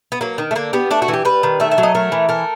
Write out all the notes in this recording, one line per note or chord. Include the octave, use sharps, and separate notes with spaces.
B3
F#3 A#3
D#3
A3
D3 A#3
G3 B3
A3 D4
F#4
E3
G4
G3 B4
D#3
A3 E5
E5
F#3
D#5
A3 A#4
E3
A3 A#4